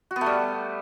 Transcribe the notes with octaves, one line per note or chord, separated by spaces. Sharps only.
F#4
B3
A3
G3